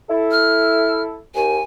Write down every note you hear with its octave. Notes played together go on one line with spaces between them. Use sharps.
E4 A4
F6
D#2 G#5